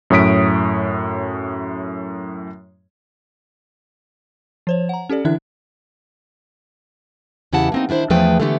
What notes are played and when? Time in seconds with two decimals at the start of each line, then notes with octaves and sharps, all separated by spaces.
0.10 F#2 A2 C#5 D#6 B6 D7
4.67 F3 C5 C#5
4.89 F#5 A#5
5.09 C#4 G4 A4 D5
5.25 D3 E3 D4 E4 E5 F#6
7.53 E2 C#3 E4 G4 F#5 A5
7.72 A#3 C4 D#4
7.89 D#3 D4 E4 C5
8.10 E2 F3 A3 G#4 B4 G5
8.40 D3 E3 G3 A3 B3 G4